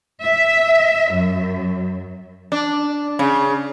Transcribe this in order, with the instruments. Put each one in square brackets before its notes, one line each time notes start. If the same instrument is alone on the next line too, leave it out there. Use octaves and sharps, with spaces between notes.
[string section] E5
F#2
[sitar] D4
C#3